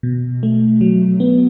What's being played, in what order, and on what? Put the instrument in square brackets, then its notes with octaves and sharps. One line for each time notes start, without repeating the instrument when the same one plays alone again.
[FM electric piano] B2
A3
F#3
B3